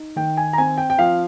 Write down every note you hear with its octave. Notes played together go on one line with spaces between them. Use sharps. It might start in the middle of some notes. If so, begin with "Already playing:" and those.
Already playing: D#4
D#3 G5
G#5
A#5
C4 G#5
G5
G5
F3 F5